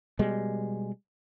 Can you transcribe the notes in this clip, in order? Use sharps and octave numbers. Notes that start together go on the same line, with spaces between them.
B2 G3 G#3